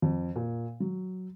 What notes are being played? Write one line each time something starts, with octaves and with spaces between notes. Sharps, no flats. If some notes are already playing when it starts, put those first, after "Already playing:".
F2
A#2
F#3